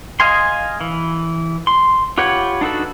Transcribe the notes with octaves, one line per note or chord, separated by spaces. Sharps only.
D#5 F5 G#5 C6
E3
C6
F4 G4 B4 C#5 F#5
D4 D#4 F#4 A4 B4